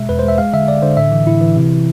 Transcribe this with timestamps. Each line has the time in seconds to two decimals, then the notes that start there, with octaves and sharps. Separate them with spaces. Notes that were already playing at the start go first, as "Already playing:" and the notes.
Already playing: B2 G#3 E5
0.09 E2 B4
0.19 G#3 C5
0.28 E5
0.38 G#3 F5
0.53 D3 E5
0.68 D3 D5
0.82 D3 C5
0.97 A2 E5
1.12 E3
1.27 A2 E4
1.41 E3
1.56 C3